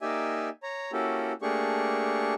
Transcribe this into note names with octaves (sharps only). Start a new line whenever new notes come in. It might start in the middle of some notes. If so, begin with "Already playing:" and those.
A#3 D#4 G4 D5 E5 G#5
C#5 A#5
A#3 C#4 E4 F#4 G4 A4
A3 A#3 D4 G4 G#4 C#6